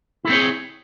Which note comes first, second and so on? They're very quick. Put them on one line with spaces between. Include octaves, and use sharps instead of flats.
E4 A4 C4 C#5 G#4